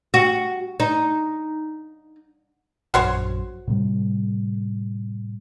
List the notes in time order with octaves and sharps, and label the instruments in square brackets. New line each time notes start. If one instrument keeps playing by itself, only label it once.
[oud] F#4
D#4
[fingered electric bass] A#1 F#2 [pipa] F#4 C5 C#5
[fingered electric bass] A2 C3 G3